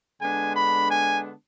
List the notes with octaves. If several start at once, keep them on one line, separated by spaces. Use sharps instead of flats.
D3 G#3 B3 D4 G#5
B5
G#5